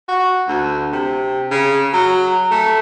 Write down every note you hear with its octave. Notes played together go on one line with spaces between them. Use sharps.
F#4
D2
C3
C#3
F#3
A3